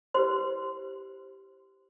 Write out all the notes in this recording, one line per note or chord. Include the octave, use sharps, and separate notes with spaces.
E4 G4 B4 C5 C6